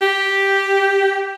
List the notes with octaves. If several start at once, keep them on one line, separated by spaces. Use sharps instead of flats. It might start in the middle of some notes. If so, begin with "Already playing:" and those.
G4